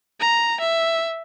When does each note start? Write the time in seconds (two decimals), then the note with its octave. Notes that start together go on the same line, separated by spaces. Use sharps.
0.20 A#5
0.60 E5